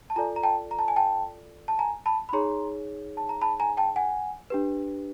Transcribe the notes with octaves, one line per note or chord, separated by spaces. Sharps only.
A5
F4 A4 D5 G#5 A#5
A#5
G5 A5
A#5
A5
G#5
G5 A5
A5
G#5 A#5
A5 B5
B5
D#4 G#4 C#5 A#5 C6
A5
A#5
A5 B5
G#5 A#5
G5 A5
F#5 G#5
D4 G4 B4